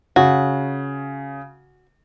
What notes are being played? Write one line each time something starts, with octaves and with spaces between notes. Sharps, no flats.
C#3 F#4